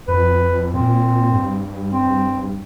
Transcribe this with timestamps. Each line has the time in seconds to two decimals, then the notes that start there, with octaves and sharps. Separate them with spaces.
0.08 F2 B4
0.74 A#2 C4
1.32 G2
1.93 C4